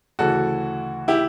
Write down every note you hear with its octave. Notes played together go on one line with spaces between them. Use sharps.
D2 C#3 E3 F#4 A4
E4 G4